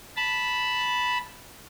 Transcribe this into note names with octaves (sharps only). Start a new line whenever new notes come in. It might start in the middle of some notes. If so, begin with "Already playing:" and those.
A5 B5